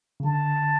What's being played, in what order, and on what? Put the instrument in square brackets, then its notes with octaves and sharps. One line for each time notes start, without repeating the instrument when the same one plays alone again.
[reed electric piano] C#3
[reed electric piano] D3 [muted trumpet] A5